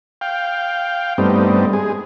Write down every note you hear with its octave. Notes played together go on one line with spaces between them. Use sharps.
F5 G5
G2 G3 A3 B3 C4 D#4
G#3 G#4